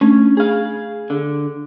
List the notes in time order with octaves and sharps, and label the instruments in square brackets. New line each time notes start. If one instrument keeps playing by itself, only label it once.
[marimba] A3 D4 [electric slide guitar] C#4
[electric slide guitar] G#4 F5
D3